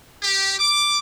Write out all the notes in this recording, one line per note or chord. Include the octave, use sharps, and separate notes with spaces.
G4
D6